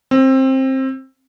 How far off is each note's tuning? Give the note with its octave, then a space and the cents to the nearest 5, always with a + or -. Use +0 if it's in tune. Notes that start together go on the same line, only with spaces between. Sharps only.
C4 +20